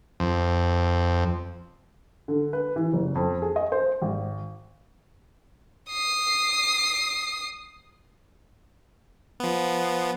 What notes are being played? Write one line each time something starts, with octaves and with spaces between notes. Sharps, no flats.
F2
D3
B4
E3
F#1
F2
G#4
D#5
C5
G#1
D#6 C7
F3 B3